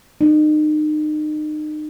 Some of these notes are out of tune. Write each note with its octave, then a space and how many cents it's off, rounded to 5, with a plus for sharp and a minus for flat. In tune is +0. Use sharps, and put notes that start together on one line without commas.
D#4 -35